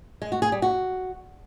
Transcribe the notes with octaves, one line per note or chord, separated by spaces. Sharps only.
G#3
F#4
G#4
G3
F#4